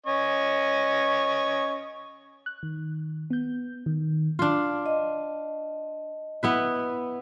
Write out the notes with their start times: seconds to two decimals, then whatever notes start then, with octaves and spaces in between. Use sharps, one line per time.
0.07 C#4 D#5 C#6
2.46 F#6
2.63 D#3
3.30 B3 G6
3.86 D#3
4.39 D4 F4
4.86 D#5
6.43 B3 E4 B4